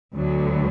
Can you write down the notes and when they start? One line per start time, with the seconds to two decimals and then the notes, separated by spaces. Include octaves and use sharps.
0.15 D2 D3 F#3